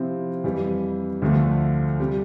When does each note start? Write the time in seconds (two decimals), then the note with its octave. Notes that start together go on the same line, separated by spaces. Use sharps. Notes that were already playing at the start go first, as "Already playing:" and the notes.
Already playing: C3 F3 C4 E4
0.44 F2 E3 G3
1.22 D2 D3 F3 A3
2.00 C3 G3